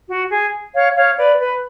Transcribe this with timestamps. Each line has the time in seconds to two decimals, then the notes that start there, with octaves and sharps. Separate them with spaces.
0.09 F#4
0.31 G#4
0.74 C#5 F5
0.96 C#5 F5
1.17 B4 D5
1.39 B4